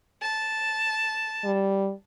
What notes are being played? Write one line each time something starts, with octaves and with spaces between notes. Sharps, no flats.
A5
G3